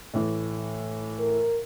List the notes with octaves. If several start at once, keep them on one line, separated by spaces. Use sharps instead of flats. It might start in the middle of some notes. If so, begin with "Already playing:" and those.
A2 E3
A#4